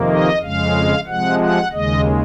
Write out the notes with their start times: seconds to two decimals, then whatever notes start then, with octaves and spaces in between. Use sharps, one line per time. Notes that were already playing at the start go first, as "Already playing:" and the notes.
Already playing: F2 C3 D#3 A#3
0.09 D#5
0.41 F2 C#3 G#3 F5
1.07 C3 F3 G#3 F#5
1.39 F#5
1.72 D#2 C#3 G#3 D#5